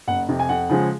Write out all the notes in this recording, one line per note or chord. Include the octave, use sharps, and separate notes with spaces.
F#1 F#5
F2 C3
G#5
F2 F#5
C#3 F3 G#3